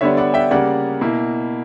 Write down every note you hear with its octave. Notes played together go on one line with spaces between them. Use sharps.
D3 G3 B3 D4 C#5 E5
D5 F#5
E5 G5
C#3 G3 A#3 D5 F#5
B2 A#3 E4